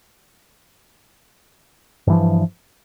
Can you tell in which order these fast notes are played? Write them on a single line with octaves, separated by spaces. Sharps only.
G2 E3 F3